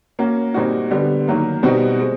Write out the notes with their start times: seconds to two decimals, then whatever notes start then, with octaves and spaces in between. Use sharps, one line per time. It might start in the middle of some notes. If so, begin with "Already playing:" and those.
0.19 A#3 C#4 F#4
0.54 A#2 G3 C4 D#4 F#4
0.91 D3 G3 B3
1.28 D#3 F#3 A#3
1.63 B2 G3 C4 D#4 F#4
1.99 G#3 C4